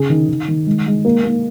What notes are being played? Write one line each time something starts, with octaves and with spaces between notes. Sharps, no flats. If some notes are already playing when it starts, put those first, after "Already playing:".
Already playing: C#3 G#4
D#3
D#3
D#3
G#3
G#3
A#3
A#3